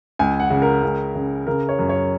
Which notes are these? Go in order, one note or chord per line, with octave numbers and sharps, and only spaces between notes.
C#2 G#5
F#5
C#3
A#4
C#2
C#3
C#3 A#4
C#5
F#2
C#5